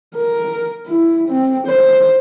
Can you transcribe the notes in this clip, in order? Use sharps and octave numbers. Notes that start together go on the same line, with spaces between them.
A#4
E4
C4
C5